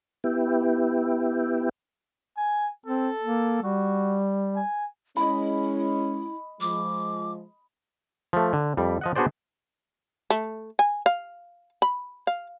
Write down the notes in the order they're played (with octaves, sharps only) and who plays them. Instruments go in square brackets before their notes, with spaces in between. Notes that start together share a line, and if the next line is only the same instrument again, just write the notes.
[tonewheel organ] B3 E4 G4
[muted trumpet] G#5
[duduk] C4 [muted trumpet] A4
[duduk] A#3
[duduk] G3 [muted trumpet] F#4
[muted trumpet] G#5
[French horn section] G#3 C#4 [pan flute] E4 [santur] D#5 B5
[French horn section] F3 G#3 [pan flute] D6
[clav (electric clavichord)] F3 A3
D3
F2 G3
F3 D#5 F#5
B3 D4 F#4 G#4 C5 D5
[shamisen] A3
G#5
F5
B5
F5